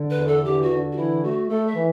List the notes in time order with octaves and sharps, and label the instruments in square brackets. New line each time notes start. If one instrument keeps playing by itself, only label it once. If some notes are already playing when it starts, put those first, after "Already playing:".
Already playing: [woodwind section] D3
[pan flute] B4
[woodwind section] E2
[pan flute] A4
[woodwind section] D3 [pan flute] G4
[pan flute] F#4
[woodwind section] D3
[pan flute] F#4
[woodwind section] E3 [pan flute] E4
[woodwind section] A3 [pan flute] F#4
[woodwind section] A3 [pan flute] A4
[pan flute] E5
[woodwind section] E3